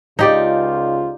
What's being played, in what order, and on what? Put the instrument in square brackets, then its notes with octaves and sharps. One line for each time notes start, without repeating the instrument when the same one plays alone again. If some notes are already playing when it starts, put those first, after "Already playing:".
[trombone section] C#2 F4 [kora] D#4 G4 D5